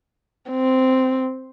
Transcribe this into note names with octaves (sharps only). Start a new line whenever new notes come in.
C4